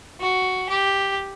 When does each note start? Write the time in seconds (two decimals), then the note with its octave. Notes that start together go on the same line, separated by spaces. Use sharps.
0.20 F#4
0.69 G4